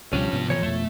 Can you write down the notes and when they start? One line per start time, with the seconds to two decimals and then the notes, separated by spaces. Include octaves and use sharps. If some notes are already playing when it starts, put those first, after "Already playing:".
0.13 C#2 B2 F3 G3 C#4 D4 G5
0.33 G#2 C3 B3
0.50 E3 A3 C#5
0.63 F2 B2 A3